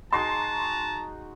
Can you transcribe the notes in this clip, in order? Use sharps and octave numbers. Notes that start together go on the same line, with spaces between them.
G#3 D#4 F#4 A5 A#5 C6 A#6 C7